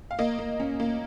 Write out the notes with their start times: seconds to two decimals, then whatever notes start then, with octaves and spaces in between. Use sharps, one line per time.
0.11 F5
0.19 A#3 D#5
0.39 A#3
0.60 C#4
0.80 A#3